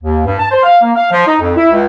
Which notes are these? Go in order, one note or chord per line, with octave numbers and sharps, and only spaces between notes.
D#2
G2
A5
C5
F5
A#3
F5
F3
D#4
F2
E4
C#2